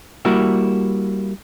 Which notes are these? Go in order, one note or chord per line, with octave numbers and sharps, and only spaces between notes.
G3 A#3 E4 F#4